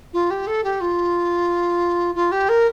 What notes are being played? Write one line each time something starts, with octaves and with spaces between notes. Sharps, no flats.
F4
G4
A4
G4
F4
F4
G4
A#4